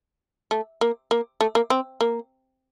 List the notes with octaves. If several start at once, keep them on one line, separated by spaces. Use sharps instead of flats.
A3
A#3
A#3
A3
A#3
C4
A#3